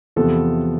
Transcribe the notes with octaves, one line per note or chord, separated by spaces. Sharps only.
E2 C3 F3 B3 A4